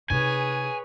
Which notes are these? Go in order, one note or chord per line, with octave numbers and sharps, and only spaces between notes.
C3 D#4 G#4 B4 C#5 G#5